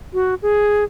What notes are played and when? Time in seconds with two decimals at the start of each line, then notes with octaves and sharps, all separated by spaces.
0.14 F#4
0.42 G#4